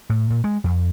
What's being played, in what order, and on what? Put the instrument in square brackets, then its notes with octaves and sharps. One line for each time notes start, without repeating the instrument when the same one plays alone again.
[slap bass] A2
A#2
G#3
F2